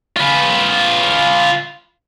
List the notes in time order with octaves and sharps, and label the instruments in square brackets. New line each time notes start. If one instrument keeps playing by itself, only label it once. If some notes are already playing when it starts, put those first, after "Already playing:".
[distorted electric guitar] F4 B4